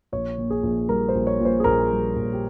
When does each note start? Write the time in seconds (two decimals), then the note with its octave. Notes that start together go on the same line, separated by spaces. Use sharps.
0.12 A#1 C#5
0.38 A#2
0.50 G#4
0.63 A#1
0.88 G3 A#4
1.09 C5
1.15 A#1
1.27 C#5
1.40 A#2
1.45 C5
1.60 G#4
1.64 A#1 A#4
1.91 G3
2.16 A#1
2.33 G4